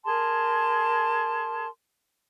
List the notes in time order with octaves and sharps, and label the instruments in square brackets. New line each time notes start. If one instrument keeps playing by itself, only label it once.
[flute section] G#4 A#4 A5 C6